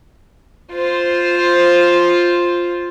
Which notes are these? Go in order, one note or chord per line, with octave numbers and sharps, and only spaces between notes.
F4 C5